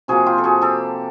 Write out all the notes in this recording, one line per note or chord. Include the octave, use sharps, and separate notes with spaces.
C3 F3 A#3 F#4 G#4
F4 G4
A4
F#4 G#4
G4 A4